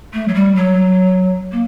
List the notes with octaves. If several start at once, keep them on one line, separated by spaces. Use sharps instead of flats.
A3
F#3
G3
F#3
A#3